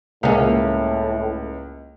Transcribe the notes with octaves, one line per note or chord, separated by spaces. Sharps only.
C#2 A2 A#3 C#4